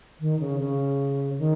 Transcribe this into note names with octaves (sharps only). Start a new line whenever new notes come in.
D#3
C#3
C#3
D#3